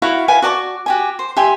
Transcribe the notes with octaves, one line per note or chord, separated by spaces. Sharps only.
E4 F#4 C#5 F5
B4 E5 F5 G#5
F#4 D5 A5 C#6
F#4 G4 G#5
C5
G4 E5 G#5 C6